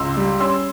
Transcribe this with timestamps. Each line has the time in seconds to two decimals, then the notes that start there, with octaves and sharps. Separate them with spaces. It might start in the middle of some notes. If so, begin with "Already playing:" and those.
Already playing: C#2 C6 E6
0.17 G3
0.40 C#4 C6 E6